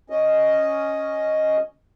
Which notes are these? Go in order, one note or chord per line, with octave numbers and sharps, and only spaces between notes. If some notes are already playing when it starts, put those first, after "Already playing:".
C#4 D#5